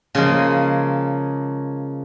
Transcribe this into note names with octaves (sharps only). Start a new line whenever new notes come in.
C#3 F3 G#3 A#3